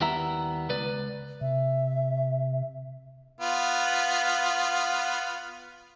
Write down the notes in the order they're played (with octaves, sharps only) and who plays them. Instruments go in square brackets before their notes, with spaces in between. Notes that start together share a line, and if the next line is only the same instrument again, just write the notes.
[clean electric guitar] D#2 G3 B3 E4 E5 A#5
C#2 B4 D5
[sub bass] C3 [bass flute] E5
[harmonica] B3 F4